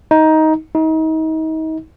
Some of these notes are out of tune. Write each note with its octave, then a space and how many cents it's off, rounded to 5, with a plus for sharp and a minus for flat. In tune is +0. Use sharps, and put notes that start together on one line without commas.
D#4 +15
D#4 +35